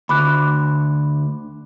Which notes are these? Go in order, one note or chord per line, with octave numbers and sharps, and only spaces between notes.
D2 B5 D6 F#6